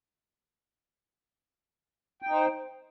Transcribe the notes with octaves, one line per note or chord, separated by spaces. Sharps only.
D#4 C5 G5